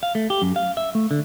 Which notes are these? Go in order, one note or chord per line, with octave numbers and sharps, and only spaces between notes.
F5
A3
G4
F#2
F5
E5
A3
D3